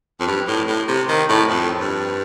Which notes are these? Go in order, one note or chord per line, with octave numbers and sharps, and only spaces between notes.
F2
G2
A2
A2
C3
D#3
A2
F2
G2